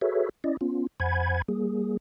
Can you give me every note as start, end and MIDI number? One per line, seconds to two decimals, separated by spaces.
0.01 0.29 66
0.01 0.29 68
0.01 0.29 69
0.01 0.29 71
0.01 0.29 73
0.01 0.29 76
0.44 0.57 61
0.44 0.57 64
0.44 0.57 74
0.44 0.57 75
0.61 0.87 59
0.61 0.87 61
0.61 0.87 65
1.00 1.42 41
1.00 1.42 72
1.00 1.42 78
1.00 1.42 80
1.00 1.42 83
1.00 1.42 92
1.48 1.97 55
1.48 1.97 58
1.48 1.97 68